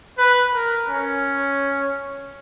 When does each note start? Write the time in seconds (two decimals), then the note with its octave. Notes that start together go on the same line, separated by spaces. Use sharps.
0.18 B4
0.54 A#4
0.89 C#4